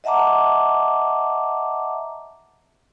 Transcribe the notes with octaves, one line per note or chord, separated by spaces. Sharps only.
D#5 E5 F#5 A5 A#5 D6